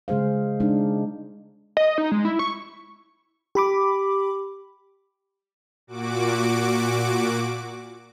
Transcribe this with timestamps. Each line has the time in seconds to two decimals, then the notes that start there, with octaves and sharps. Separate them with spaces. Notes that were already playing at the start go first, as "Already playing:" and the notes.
0.08 C#3 G#3 G#4 C5 F5
0.60 G#3 D4 D#4
1.77 D#5
1.98 D#4
2.12 G#3
2.25 E4
2.39 C#6
3.55 G4 B5 D6
5.87 A#2 F#4 D6